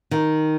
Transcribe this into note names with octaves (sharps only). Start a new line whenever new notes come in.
D#3